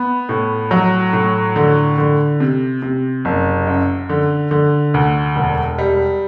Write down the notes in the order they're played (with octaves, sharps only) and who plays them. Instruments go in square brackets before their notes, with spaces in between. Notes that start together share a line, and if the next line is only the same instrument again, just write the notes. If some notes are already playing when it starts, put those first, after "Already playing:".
Already playing: [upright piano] B3
A2
F#3
A2
D3
D3
C3
C3
F#1
F#2
D3
D3
D2
E1
G3